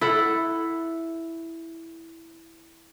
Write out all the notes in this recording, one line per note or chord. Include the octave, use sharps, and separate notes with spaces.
E4 A4 F#5